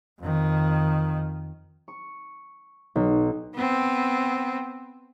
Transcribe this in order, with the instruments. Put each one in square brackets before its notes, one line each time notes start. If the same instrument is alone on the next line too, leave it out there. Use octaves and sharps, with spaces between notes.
[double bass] F2 D#3
[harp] C#6
B1
[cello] B3 C4